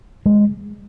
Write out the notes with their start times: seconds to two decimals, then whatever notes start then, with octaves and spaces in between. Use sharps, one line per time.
0.26 G#3